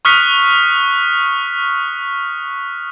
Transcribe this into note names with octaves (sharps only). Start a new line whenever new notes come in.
C#6 D#6 F6 F#6 B6 C#7